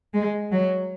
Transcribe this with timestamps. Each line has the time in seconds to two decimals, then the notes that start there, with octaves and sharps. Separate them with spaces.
0.14 G#3
0.52 F#3